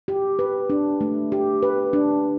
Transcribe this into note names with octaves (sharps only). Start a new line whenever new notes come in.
G4
B4
D4
A3
G4
B4
D4